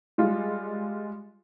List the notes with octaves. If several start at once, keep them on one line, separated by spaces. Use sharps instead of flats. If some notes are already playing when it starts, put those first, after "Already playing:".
G3 G#3 F4